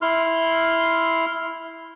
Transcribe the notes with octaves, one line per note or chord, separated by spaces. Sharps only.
E4 C6 F6